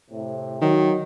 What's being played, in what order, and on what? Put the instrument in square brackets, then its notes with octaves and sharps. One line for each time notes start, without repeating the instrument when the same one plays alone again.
[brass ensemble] A2 C3
[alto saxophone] D#3 [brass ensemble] F#3